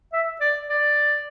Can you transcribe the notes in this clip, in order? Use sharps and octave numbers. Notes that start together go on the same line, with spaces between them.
E5
D5
D5